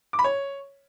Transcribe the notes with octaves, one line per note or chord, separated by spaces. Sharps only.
D6
B5
C#5